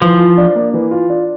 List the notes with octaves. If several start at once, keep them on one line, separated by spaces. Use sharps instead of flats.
E3 F3
F4
D4
A#3
E3
F4
D4